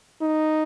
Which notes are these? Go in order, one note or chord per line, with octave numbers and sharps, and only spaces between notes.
D#4